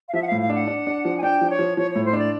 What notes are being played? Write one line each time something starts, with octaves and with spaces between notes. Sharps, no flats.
F5
F3 E5
F#5
A2 F5
F5
D4 F#5
D4
D4
F3
G#5
D4 G5
F3
C#5
F3
F3 C#5
A2 C#5
C5
D4
D5